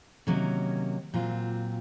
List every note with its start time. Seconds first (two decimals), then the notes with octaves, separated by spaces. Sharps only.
0.27 C3 D#3 F#3 A#3 C#4
1.14 A#2 F#3 C4 F4